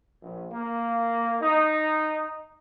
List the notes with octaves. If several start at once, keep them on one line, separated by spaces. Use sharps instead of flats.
A#1
A#3
D#4